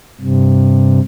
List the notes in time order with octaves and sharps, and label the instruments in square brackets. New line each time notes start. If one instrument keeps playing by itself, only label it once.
[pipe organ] G2 C3